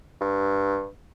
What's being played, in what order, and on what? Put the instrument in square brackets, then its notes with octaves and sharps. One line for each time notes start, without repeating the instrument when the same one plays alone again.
[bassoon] G2